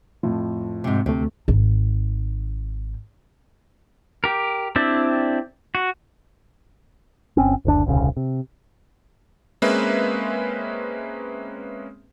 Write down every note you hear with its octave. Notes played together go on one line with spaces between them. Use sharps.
F2 A2 F3
G#2 C3
D2 C3 A3
G#1 D#4
G4 A#4
C4 D4 E4 G4 D5
F#4
G1 C4 C#4
F#1 D2 D4
D#1 C2 C#3
C3
G#3 A#3 C4 C#4 B4 E5